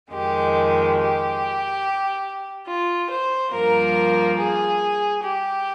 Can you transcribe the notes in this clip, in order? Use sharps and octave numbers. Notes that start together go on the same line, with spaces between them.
F2 D#3 G#3 G4
G4
F4
C5
G2 F3 A#3 A#4
G#4
G4